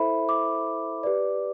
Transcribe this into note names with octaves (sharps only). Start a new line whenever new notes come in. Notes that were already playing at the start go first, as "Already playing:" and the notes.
Already playing: E4 A4 C5 E5 B5
D6
G4 B4 D5